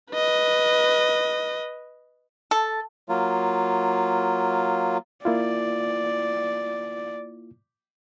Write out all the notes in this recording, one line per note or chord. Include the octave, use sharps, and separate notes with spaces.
B4 D#5
A4
F#3 A#3 F4
A#3 E4 F4 D5